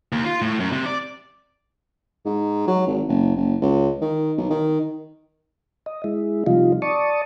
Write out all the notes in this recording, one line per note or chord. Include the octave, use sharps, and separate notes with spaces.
D#2
F4
A2
F#2
C3
D5
G#2
F#3
G#1
F#1
F#1
C#2
D#3
B1
D#3
D#5
G#3 E4
C3 F3 G3 D#4 F4
D5 A5 C#6 D#6